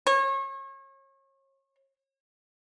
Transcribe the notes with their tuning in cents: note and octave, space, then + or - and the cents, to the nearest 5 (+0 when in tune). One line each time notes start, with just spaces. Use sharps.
C#5 -35